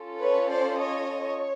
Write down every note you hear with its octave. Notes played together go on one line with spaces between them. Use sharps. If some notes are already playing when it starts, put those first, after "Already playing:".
Already playing: C#4 F4 A4
B4 C#5
C5 D5
C#5 D#5
C#5